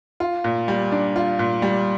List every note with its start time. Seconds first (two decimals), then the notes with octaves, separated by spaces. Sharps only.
0.20 F4
0.44 A#2
0.68 G3
0.92 D4
1.16 F4
1.39 A#2
1.62 G3